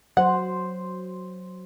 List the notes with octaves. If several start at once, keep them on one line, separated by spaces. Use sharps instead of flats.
F#3 C5 F#5